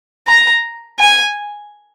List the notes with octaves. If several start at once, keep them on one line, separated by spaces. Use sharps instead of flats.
A#5
G#5